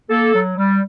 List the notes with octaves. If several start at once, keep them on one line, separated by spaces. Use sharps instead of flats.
A#3 A4
F#3
G3